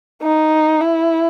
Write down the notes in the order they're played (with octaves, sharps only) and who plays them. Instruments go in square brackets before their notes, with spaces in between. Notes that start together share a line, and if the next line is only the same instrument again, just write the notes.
[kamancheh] D#4
E4